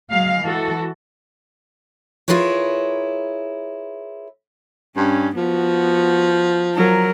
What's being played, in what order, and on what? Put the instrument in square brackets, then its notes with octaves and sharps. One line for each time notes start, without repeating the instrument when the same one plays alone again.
[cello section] F#3 G#3 F5
E3 F#4 A4
[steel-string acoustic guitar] E4 F4 G#4 A#4 B4 C#5
[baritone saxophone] G2 [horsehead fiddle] C#4
[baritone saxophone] F3 [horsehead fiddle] B3 F#4
[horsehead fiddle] F#3 A#4